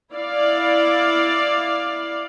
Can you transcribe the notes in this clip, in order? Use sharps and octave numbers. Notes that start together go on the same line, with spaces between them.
E4 D5 F5